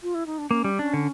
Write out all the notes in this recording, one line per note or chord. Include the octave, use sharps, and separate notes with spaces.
F4
E4
D#4
D4
A#3 C#4
G3
C#4 D4
D3